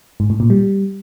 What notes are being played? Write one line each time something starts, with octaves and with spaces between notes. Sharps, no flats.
G#2
A2
A#2
G3